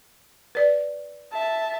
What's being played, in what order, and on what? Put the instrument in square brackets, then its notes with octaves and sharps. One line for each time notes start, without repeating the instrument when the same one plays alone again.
[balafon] B4 D5
[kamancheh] E5 A5